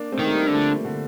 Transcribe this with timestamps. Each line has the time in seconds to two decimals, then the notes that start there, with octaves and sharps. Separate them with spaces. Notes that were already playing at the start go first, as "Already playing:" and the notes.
Already playing: A#3 D4
0.12 A3 C4
0.19 D#3
0.26 A3
0.33 G3 A#3
0.47 D3
0.53 F3 A3
0.85 D3